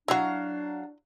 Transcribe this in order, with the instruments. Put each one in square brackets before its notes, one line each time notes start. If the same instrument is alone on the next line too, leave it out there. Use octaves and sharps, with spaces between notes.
[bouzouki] F#3 F5 A#5 [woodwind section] D4 [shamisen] E4 F#4